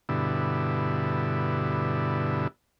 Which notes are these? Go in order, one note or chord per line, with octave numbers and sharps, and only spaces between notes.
G2 B2 D3 E4